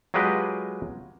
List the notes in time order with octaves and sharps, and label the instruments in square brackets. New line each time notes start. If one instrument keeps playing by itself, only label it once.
[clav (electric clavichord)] F#3 G#3 F4 G4 B4 D#5